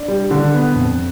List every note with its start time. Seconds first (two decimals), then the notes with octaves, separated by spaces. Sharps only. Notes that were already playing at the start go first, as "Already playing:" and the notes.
Already playing: D4
0.08 G3
0.31 D3
0.54 B3
0.75 F2